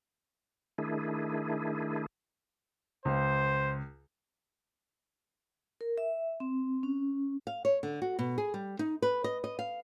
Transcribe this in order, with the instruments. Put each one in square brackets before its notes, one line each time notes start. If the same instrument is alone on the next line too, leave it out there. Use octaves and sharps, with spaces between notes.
[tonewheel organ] D#3 A3 D4 E4 G#4
[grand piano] C#2 [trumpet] C5
[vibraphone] A#4
E5
C4
C#4
[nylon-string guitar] F5
C#5
D3
F#4
B2
G#4
G3
D#4
B4
D#5
D#5
F5